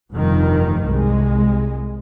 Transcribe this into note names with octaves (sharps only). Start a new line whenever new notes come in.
F1 G2 D#3 F3
C2 G#3